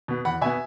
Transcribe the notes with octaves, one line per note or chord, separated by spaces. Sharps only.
B2 B3
E2 F#5 B5
B2 B3 E5 G#5